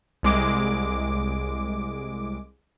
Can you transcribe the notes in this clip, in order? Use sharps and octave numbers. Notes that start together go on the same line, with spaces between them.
C2 G#3 D6